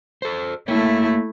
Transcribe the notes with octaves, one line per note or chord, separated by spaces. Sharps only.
A4 C5
A3 A#3 E4 C#5